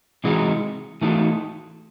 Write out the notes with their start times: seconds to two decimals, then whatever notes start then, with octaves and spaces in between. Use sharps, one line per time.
0.24 C3 E3 G#3 D#4 F#4
1.01 E3 A3 D#4 F#4